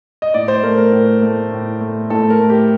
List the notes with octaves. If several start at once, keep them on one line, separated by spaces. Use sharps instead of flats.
D#5
A2 D5
C5
A3 A#4
A#4
A2
A3
A2
A3
A2 A4
A#4
A3
G4